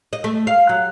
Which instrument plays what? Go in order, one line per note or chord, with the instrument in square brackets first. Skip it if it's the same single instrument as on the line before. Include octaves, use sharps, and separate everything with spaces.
[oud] D#5
A3
F5
F#3